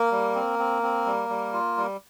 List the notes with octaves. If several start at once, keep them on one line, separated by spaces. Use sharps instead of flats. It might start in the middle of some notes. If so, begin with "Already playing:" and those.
Already playing: A#3 A#4
G3
C4
C4
C4
G3
G3
F4
G3